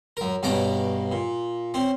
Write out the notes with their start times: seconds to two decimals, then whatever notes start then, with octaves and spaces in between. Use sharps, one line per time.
0.17 F#2 A#4
0.43 G2 B2 C#4 A5 A#5 D6
1.12 A#2
1.74 C4 C#4